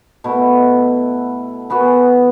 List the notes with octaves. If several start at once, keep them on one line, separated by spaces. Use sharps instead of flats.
B2 A3 E4
E3 B3 F#4